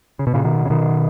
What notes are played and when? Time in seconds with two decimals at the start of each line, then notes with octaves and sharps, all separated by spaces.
0.19 C#3
0.27 B2
0.34 A#2 C#3
0.44 B2 D#3
0.65 C#3
0.70 B2 D#3